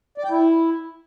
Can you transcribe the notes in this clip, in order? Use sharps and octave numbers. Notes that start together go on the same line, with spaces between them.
D5
G5
E4